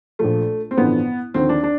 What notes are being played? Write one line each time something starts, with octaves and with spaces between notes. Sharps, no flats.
A#1 A#2 F3 A3
C4
A1 G2 D3 F3 B3
D#2 D3 F3 C4
D4
D4